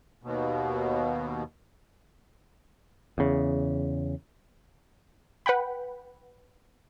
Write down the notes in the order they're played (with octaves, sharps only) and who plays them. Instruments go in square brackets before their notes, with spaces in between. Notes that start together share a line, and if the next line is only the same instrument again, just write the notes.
[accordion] D#2 B2
[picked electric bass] E2 C#3
[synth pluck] B4 F#5 G5 B5